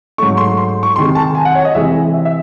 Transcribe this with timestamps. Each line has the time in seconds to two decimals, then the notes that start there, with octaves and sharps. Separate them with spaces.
0.18 G#2 F#3 A3 C#6
0.37 C6
0.57 C6
0.83 C#6
0.96 C3 D#3 G#3 C6
1.15 A5
1.35 G#5
1.45 F#5
1.55 C#5
1.65 D#5
1.75 C3 E3 G#3 E5
2.14 E5
2.25 E5